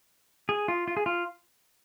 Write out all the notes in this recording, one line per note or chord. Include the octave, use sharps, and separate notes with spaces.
G#4
F4
F4
G#4
F4